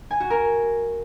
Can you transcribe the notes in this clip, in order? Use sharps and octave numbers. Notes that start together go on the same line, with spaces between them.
G#5
F#4
A#4